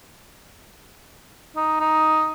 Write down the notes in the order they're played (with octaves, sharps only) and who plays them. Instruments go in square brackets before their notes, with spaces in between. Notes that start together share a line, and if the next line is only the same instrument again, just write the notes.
[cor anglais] D#4
D#4